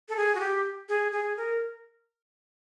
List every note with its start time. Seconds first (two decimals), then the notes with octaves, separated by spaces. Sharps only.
0.09 A4
0.17 G#4
0.35 F#4
0.40 G4
0.89 G#4
1.12 G#4
1.37 A#4